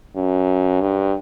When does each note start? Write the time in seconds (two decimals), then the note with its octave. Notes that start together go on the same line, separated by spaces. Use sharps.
0.15 F#2
0.81 G2